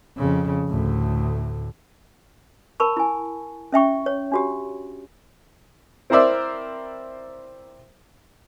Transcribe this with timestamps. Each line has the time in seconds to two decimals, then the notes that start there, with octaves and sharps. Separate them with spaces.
0.17 F2 C#3
0.68 D2 A2
2.80 A#4 A5 B5 C#6
2.97 E4 G#5
3.72 C#4 E5 G5 C#6
4.06 C#5
4.32 D4 F#4 G4
6.10 C4 E4 A#4 C5 D5 E5